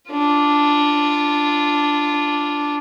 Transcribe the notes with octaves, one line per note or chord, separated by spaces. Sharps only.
D4 F4